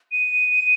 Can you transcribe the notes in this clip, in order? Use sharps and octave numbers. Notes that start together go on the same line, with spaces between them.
D#7